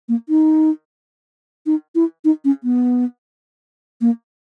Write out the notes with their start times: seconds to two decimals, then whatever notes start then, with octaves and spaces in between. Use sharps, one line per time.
0.09 A#3
0.29 D#4
1.66 D#4
1.95 E4
2.25 D#4
2.45 C#4
2.64 B3
4.01 A#3